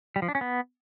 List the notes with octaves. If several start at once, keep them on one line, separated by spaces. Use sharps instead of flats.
G3
F3
D4
C#4
B3